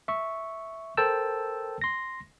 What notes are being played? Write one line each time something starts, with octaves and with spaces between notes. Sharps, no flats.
E5 C#6
A4 A#4 C5 G5 A5 E6
C6 A#6